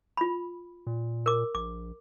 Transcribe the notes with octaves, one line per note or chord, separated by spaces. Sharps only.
F4 B5
A#2
A#4 D6
A#1 D6